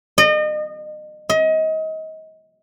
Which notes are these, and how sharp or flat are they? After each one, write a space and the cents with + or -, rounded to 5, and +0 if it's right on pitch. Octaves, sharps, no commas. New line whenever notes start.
D#5 -35
D#5 +30